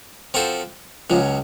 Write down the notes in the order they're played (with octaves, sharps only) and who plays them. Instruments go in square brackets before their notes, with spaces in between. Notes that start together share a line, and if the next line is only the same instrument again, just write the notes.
[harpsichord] F3 C4 F#4 A4 C5
[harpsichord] C#2 C#3 F#3 [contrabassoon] F3